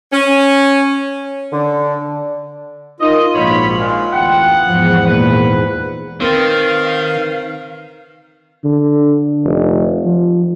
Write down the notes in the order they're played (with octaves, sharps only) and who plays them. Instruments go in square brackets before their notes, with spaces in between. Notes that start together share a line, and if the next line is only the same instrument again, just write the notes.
[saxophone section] C#4
[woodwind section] D3
[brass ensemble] D#4 A#4 [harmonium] F4 [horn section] D#5
[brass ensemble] A#1 G#2 [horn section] B2 C#5 B5
[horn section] A#2 D#3 G#3
[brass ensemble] A1 D2 G5 [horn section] B3 F#5
[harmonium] E2 G#2 [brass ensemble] F3
[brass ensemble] A#2 [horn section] B4
[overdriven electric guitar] D#3 [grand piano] C4 [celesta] A#4 B4 A6 [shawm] F5
[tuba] D3
F1
F3